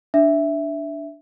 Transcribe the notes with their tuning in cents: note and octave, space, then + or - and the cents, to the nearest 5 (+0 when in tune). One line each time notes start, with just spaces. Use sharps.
D4 +0 E5 +0